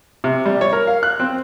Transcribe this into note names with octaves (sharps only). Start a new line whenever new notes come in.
C3
G3
C#5
A#4
F5
F#6
C4